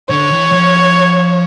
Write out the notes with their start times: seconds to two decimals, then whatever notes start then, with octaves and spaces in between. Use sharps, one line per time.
0.10 D3 C#5
0.31 E3
0.52 F3